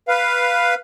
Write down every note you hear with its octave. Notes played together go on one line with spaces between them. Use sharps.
B4 F5